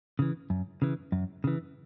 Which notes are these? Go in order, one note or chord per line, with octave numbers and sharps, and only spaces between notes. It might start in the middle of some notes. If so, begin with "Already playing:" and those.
C#3 E3
F#2
C#3 E3
F#2
C#3 E3